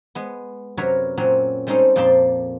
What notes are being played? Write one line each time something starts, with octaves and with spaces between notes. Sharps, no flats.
G#3 B3
F#2 C3 F#3 A#4 B4 C#5
A#2 F#3 C4 C#4
G3 G#3 C4 C#4 D#4 A4
F2 A#2 F3 D5 A5 C6